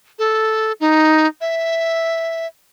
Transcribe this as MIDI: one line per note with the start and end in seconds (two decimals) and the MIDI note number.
0.19 0.72 69
0.80 1.27 63
1.41 2.47 76